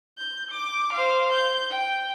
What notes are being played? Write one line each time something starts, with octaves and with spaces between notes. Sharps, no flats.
G6
D6
C5 F5
G6
G5